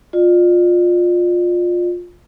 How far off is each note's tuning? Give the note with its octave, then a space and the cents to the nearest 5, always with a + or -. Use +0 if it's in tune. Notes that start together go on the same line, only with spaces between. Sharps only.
F4 +15 D5 +40